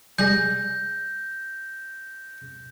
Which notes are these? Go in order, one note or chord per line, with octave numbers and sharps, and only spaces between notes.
G3 G#3 G#4 G6 A#6